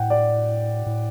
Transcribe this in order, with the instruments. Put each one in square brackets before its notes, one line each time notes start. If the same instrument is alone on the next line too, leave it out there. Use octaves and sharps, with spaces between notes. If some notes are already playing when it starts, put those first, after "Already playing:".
Already playing: [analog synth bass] A2 [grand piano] F#5 G5
[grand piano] D5
[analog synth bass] A2